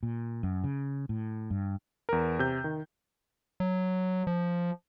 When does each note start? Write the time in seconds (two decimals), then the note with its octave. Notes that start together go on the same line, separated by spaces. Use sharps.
0.03 A#2
0.43 F#2
0.64 C#3
1.09 A2
1.51 G2
2.09 E2 A#4
2.39 C3 G6
2.64 D#3
3.60 F#3
4.27 F3